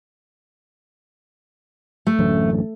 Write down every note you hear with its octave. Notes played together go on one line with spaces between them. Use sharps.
A3
A1 F#2 D3